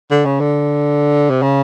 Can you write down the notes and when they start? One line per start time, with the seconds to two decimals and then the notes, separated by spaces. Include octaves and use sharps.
0.11 D3
0.25 C#3
0.40 D3
1.30 C3
1.42 C#3